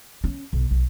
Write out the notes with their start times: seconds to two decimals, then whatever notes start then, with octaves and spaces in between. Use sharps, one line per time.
0.24 C#4
0.53 B1
0.71 B1